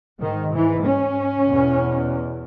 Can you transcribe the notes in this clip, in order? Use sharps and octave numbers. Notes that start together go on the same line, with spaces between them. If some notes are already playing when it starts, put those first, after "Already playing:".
G#2 D#3
E3
C#4
E2 B2